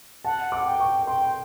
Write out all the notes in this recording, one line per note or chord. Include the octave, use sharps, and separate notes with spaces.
F#5 A5
D6
G5
C#6
G5 C6